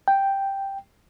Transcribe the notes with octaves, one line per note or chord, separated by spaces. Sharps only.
G5